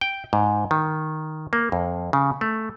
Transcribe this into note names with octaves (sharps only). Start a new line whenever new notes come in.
G5
G#2
D#3
A#3
F2
C#3
A3